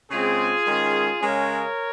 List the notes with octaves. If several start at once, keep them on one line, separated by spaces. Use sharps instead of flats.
C#3 G#3 C4 F4 G#4
D#3 G#3 C#4
C#3 G#3 C#4 A#4 C#5